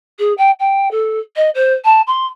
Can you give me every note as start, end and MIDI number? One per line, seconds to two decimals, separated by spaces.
0.19 0.33 68
0.38 0.51 79
0.60 0.91 79
0.91 1.19 69
1.36 1.50 75
1.55 1.74 72
1.85 2.02 81
2.07 2.26 84